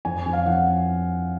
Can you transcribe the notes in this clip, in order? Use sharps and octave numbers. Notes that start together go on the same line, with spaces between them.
F2 G#5
F2
F5
F2 F#5